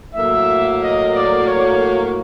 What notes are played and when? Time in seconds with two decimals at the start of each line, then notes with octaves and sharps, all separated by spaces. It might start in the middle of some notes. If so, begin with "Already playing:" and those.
0.14 A2 F#3 A#3 E5
0.81 D#5
1.14 D5
1.47 C#5